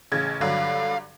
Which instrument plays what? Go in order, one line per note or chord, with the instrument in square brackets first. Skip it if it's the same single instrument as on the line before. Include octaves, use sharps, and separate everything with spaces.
[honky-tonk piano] A1 C#3 G#6
[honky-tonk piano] G2 D3 F#3 [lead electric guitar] F5